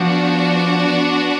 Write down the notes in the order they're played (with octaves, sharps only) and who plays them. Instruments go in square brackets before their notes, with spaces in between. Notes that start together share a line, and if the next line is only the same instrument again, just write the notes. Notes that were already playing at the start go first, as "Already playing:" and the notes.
Already playing: [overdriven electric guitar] F3 [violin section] B3 D4 F#4